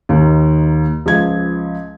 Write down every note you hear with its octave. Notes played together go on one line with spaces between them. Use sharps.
D#2 D#3
C#2 F3 G#6